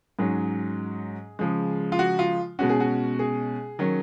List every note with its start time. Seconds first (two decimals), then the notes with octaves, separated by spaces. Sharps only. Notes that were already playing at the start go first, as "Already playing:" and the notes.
0.19 G#2 F#3 C#4 G#4
1.39 C#3 F3 G#3
1.92 F4
1.99 F#4
2.19 F4
2.59 B2 G#3 C#4 F#4
2.69 G#4
2.80 F#4
3.19 G#4
3.79 D#3 F#3 C#4